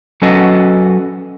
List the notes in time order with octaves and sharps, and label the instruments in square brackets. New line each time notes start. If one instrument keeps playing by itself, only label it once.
[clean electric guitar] F#3 C#4 F#4 A4 B4 D#5